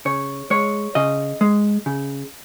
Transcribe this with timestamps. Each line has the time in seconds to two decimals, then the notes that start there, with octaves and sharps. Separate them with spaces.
0.05 C#3 C#5
0.50 G#3 C#5
0.95 C#3 D#5
1.41 G#3
1.86 C#3